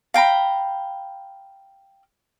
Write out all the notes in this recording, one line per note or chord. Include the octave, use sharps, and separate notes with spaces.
F5 G5 A#5 B5